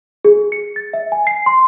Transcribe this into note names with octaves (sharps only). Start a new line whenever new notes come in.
G#4
C#7
A6
E5
G#5
C7
C6